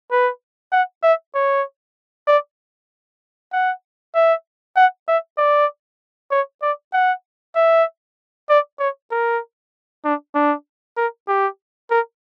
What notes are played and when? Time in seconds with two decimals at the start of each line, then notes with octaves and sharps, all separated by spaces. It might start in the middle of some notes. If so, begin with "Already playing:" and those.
0.11 B4
0.73 F#5
1.03 E5
1.35 C#5
2.28 D5
3.53 F#5
4.15 E5
4.77 F#5
5.08 E5
5.38 D5
6.32 C#5
6.63 D5
6.93 F#5
7.56 E5
8.50 D5
8.80 C#5
9.11 A#4
10.05 D4
10.35 D4
10.97 A#4
11.28 G4
11.91 A#4